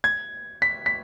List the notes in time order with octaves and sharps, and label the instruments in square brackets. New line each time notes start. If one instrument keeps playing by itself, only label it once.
[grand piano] G#6
B6
B6